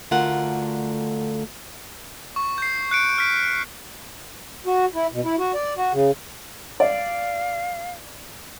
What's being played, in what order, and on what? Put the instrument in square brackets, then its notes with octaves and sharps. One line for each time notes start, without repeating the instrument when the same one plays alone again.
[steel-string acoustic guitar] D2 D3 A3 F4 A#4 F#5
[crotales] C#6
G6 C7
F#6 C#7 D7
F6 B6 D7
[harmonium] F#4
E4
B2
E4
F#4
D5
F#4
C#3
[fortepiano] D5 [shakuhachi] F5